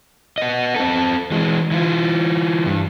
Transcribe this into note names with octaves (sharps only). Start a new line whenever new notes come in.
B3 D#5
C4 A4
E3 G#3
E3 F4
G2